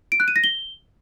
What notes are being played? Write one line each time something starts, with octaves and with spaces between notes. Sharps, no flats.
D7
F#6
D#7
A#6
G7